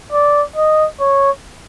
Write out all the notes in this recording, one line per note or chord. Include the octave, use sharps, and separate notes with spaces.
D5
D#5
C#5